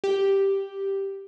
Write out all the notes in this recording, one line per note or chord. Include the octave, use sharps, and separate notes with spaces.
G4